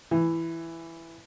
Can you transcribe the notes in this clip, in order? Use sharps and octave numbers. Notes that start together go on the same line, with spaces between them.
E3